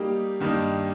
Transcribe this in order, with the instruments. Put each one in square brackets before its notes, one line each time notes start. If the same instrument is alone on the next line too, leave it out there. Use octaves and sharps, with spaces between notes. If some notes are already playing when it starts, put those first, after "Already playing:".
Already playing: [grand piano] G3 A#3 D#4 G4
G2 D#3 G3 A#3 D#4